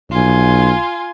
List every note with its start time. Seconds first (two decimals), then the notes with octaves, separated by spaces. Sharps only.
0.11 B1 F4 G#5